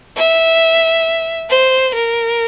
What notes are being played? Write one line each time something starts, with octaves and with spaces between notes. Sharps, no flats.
E5
C5
A#4